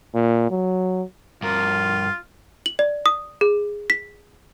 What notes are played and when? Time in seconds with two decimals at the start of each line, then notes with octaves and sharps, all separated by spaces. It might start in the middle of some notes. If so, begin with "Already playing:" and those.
0.15 A#2
0.50 F#3
1.43 G2 F4 A#4
2.66 F#7
2.79 D5
3.06 D#6
3.41 G#4
3.90 B6